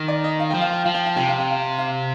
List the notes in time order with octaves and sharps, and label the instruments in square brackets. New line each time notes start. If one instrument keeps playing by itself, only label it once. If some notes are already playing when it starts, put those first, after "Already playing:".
Already playing: [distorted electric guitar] D#3
[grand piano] D5
D#5
F5
[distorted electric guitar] F3 [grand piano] G5
[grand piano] F5
G5
[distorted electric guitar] F3 [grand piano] F5
[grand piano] G5
F5
[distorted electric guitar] C3 [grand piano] G5
[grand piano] F5
G5
F5
F5